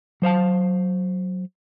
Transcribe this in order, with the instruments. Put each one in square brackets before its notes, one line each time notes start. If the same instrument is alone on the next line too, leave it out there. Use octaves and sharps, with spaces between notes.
[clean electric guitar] F#3 C5 F5 A5